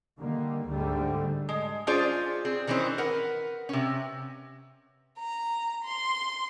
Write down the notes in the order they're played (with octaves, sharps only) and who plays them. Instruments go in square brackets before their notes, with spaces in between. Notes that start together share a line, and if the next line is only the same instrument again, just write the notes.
[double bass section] D3 D#3 G3 A#3
D2 G#2 D3 G3 A3
[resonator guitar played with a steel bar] G#3
C#4 F4 G#4 C5 D5
C4 G#4
D#3 E3 C4 C#4 C5
A#4 B4 F#5
C3 C#4
[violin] A#5
C6